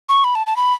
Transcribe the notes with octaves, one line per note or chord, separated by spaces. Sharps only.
C#6
B5
A5
A5
B5